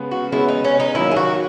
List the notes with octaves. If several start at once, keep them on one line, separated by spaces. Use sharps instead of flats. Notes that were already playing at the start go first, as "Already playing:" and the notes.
Already playing: C#3 G#3 B3
F#4
C#3 G#3 B3 E4
D#4
C#4
D#4
D#3 F#3 A#3 E4
G#4
F#4